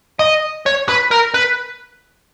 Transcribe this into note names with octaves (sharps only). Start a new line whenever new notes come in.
D#5
C#5
B4
A#4
B4